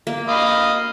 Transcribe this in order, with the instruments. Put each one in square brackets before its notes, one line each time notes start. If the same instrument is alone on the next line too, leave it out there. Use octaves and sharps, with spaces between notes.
[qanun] A#3
[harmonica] D#5 F5 B5